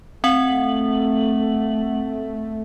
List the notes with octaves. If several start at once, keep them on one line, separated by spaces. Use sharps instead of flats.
A3 C4 F#5 F#7